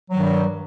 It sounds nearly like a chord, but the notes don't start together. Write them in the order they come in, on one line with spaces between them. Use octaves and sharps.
F#3 D#3 G2 G3